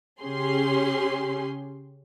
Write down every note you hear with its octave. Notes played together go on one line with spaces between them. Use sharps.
C#3 C#4 G4 G#4 C6